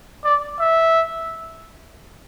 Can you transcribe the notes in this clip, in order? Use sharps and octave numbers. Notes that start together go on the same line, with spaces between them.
D5
E5